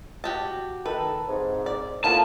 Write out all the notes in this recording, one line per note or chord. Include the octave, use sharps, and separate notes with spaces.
F#4 G4 A5
D#3 A4 B4
C2 G#2
D5
A2 E3 A#3 B3 F4 A5